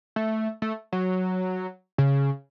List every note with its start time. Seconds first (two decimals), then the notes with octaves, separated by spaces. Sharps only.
0.16 A3
0.62 A3
0.92 F#3
1.98 C#3